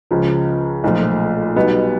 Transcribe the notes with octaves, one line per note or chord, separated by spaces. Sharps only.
C#2 C#3 F3
B1 A#2 F3 A3
B1 B2 G3 B3 D#4